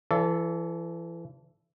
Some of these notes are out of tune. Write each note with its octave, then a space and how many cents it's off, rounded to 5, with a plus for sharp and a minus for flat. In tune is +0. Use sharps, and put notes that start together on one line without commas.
E3 +35 A4 +0 D5 -35